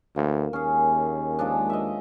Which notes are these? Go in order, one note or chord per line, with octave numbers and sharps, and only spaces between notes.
D2 A#3
D#2 C#4 G#4
F3 G#3 D4
D#5 E5